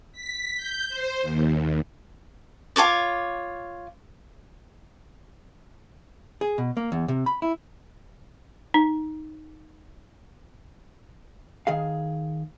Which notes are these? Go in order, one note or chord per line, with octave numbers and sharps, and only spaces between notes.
B6
G6
C5
D#2
F4 A4 C#5 D6
G#4
B2
A#3
E2
C3
B5
E4
D#4
D#3 G#4 F5